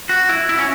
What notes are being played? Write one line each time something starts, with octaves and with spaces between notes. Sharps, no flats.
F#4
E4
E4
C#4